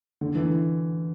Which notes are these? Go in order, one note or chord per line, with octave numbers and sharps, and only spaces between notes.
D3
E3